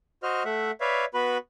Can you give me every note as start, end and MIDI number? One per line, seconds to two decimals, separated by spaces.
0.23 0.43 66
0.23 0.43 72
0.23 0.43 75
0.23 0.43 89
0.45 0.71 57
0.45 0.71 76
0.45 0.71 78
0.81 1.05 71
0.81 1.05 73
0.81 1.05 74
0.81 1.05 76
0.81 1.05 77
1.14 1.38 59
1.14 1.38 66
1.14 1.38 71
1.14 1.38 83